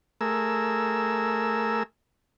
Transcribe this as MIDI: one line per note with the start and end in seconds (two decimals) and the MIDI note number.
0.21 1.83 57
0.21 1.83 68
0.21 1.83 70
0.21 1.83 88